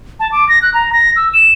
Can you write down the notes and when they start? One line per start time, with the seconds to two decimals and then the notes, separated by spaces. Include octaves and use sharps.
0.20 A5
0.32 D6
0.49 A#6
0.62 F#6
0.74 A#5
0.93 A#6
1.16 E6
1.34 E7